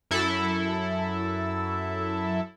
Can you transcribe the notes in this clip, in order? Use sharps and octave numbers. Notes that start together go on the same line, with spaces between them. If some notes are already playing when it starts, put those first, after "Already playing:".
F#2 E4 A4